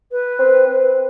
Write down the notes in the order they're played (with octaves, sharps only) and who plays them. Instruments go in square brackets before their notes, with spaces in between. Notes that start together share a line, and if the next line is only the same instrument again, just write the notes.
[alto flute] B4
[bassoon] C4
C4